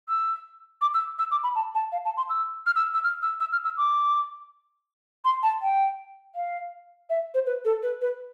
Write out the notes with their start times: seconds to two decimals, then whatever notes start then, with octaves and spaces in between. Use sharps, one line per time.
0.09 E6
0.82 D6
0.94 E6
1.19 E6
1.31 D6
1.43 B5
1.55 A5
1.75 A5
1.92 F5
2.05 A5
2.17 C6
2.30 E6
2.66 F6
2.76 E6
2.94 E6
3.04 F6
3.22 E6
3.40 E6
3.52 F6
3.64 E6
3.77 D6
5.25 C6
5.43 A5
5.62 G5
6.35 F5
7.10 E5
7.34 C5
7.46 B4
7.65 A4
7.83 B4
8.01 B4